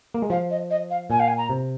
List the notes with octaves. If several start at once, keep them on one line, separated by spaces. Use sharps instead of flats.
A#3
G#3
F3 F5
D#5
D#5
F5
A#2 G#5
F5
G#5
A#5
C3